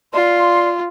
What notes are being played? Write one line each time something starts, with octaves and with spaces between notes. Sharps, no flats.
F4 D5 C6